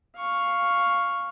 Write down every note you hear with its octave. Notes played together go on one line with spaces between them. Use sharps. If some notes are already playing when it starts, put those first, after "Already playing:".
F5 C#6